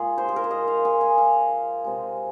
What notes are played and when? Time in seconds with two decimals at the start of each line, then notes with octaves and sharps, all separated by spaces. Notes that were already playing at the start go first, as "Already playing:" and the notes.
Already playing: A#2 G#3 F4 G#4
0.18 C5
0.28 G#4
0.36 A#4
0.44 C5
0.51 D#5
0.68 F5
0.85 G#5
1.01 G#5
1.18 F5
1.84 C3 G#3